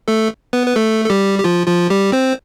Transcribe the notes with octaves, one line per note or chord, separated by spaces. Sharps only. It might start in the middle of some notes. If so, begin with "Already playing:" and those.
A3 A4
B3 B4
B4
A3 A4
A4
G3 G4
G4
F3 F4
F3 F4
G3 G4
C4 C5